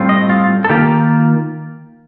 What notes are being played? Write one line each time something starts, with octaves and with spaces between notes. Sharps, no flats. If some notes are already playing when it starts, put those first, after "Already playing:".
Already playing: A2 G3 C4 F4
D#5
F4
A4
D#3 A#3 F4 G4